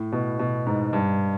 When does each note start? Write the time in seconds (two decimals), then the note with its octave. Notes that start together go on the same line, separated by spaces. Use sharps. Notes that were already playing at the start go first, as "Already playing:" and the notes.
Already playing: A2
0.12 B2
0.39 B2
0.66 G#2
0.93 G2